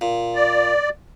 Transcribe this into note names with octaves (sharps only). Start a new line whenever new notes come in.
A#2
D5